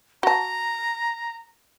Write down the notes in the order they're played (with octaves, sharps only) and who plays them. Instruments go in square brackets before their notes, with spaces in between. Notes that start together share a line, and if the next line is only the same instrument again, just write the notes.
[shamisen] F#4 A5 [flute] A#5